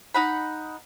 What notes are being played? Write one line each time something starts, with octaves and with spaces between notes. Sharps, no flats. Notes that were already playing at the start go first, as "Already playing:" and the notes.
D#4 F#5 B5